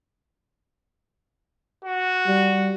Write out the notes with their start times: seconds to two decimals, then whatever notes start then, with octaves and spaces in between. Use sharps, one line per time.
1.85 F#4
2.27 G3